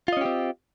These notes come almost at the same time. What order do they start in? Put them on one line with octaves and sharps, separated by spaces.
F4 D#5 C#4 G4 C4